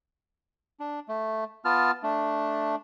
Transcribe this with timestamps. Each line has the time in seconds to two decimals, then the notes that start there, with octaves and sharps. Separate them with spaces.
0.80 D4
1.08 A3
1.65 B3 F4 A5 F6
2.03 A3 D4